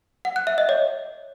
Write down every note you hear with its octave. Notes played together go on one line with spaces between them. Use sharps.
F#5
F#6
E5
D#5
C#5